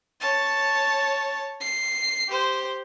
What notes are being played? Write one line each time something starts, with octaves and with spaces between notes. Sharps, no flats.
C#5 A5
C7
G4 C5